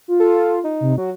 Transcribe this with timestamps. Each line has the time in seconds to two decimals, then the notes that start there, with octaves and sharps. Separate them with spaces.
0.08 F4
0.20 A4
0.64 D#4
0.81 C3
0.98 F#3 F#4